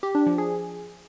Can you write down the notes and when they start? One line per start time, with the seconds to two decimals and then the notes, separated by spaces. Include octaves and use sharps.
0.03 G4
0.15 D4
0.26 F3
0.38 G#4